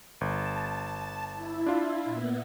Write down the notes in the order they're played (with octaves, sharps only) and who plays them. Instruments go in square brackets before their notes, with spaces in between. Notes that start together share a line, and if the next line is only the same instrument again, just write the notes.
[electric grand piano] G1 [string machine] A5
[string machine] E4
[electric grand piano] D4 F4
[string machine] A#2 B3